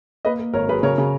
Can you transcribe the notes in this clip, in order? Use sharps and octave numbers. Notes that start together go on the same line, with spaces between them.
A#3 B4 D#5
A#3
G#1 A#4 C#5
F#2 G#4 B4
C#3 A#4 C#5
C#3